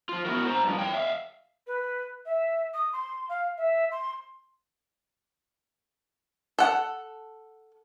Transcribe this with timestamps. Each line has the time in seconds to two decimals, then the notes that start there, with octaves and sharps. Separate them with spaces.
0.09 F3 F4
0.25 B3 E4 F#4 A#4
0.46 C5 A#5
0.63 G2 F3
0.79 C#5 G5
0.94 E5 F5
1.67 B4
2.26 E5
2.74 D#6
2.93 C6
3.29 F5
3.58 E5
3.91 C6
6.58 A4 F#5